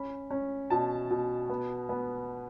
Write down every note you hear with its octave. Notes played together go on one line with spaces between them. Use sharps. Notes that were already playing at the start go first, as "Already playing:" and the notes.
Already playing: C#4 B5
C#4
B2 A5
B2
B3
B3